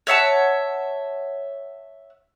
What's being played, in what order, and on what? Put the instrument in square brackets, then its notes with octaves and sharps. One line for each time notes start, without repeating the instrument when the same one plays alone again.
[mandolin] C#5 E5 F#5 A5